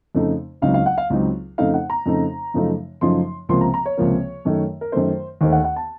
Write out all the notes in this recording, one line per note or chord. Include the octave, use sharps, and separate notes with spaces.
F2 C#3 A3 D#4
C#2 C#3 F#3 C4 D#4 F5
F5
F#5
F5
C#2 C#3 F#3 C4 D#4
F2 C#3 A3 D#4 F5
F#5
A#5
F2 C#3 A3 D#4
F#2 C#3 F3 A3 D#4
F#2 C#3 F3 A3 D#4 C6
C#2 C3 F3 A#3 C6
A#5
A#5
C#5
C#2 C3 F3 A#3
F#2 D#3 A3
A#4
F#2 D#3 A3 C5
D#2 D#3 A3 C5
F#5
F#5
A5